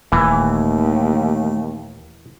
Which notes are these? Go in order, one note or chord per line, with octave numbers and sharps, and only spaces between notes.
D#1 D#2 E3 A3